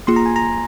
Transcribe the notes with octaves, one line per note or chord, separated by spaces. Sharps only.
A#3 F4 G#4 C6
A#5
G#5
A#5